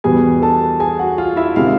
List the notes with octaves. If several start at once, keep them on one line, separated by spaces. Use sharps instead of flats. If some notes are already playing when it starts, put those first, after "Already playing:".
E2 B2 G3 B3 G#4 G#5
A4 A5
G#4 G#5
F#4 F#5
F4 F5
E4 E5
C3 D#3 G#3 C4 E4 F4 F5